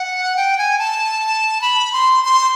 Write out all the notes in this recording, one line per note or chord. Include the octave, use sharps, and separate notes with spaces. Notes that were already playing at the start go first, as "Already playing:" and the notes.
Already playing: F#5
G5
G#5
A5
B5
C6
C6